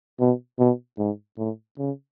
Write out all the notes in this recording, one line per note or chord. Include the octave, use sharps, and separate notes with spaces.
B2
B2
G#2
A2
C#3